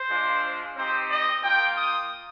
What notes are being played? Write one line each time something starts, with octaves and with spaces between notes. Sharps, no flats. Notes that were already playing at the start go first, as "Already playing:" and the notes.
Already playing: C5
G#3 D4 F4
C4 D#4 G4 C5
D#5
A#3 F4 G5
D#6